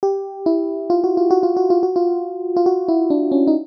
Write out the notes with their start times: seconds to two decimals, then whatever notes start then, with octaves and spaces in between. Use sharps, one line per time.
0.03 G4
0.46 E4
0.90 F4
1.04 F#4
1.17 F4
1.31 F#4
1.43 F4
1.57 F#4
1.70 F4
1.83 F#4
1.96 F4
2.57 F4
2.66 F#4
2.88 E4
3.10 D4
3.32 C#4
3.47 D#4